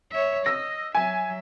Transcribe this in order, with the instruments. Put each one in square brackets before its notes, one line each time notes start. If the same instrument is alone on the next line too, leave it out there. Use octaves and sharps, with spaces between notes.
[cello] C#5 E5
[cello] D#5 [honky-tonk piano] E6 A#6
[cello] F#3 E5 [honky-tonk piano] G#5